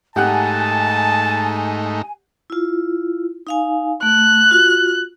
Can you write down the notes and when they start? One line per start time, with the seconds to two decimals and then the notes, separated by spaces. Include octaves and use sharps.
0.16 G#2 A3 D#4 G4 F#5 G#5 A5 F#6
2.50 E4 F4
3.47 D#4 F5 G#5
4.03 A3 F#6
4.51 F4 F#4